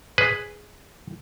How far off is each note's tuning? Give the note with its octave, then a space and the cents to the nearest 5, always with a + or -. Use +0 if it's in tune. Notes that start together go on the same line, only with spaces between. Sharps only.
G#4 +0 B4 +5